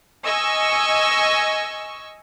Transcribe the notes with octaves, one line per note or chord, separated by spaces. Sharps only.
D#5 G#5 C#6 E6